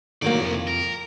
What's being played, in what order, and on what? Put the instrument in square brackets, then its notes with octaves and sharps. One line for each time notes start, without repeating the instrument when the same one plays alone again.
[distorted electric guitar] C2 D5 [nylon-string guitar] D#3 F#3 A#3
[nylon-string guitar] F2
[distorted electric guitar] A#4